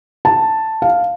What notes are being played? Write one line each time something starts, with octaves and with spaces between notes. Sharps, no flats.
A5
F5